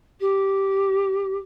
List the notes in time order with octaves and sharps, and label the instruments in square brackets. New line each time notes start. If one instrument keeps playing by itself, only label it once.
[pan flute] G4